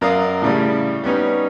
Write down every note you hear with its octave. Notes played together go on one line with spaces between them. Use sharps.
F#2 A#4 D5 F5 D#6
A2 C#3 G3
G3 B3 C#4 D#4